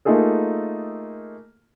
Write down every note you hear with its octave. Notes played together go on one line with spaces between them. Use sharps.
A3 A#3 D#4 F4 G#4 A4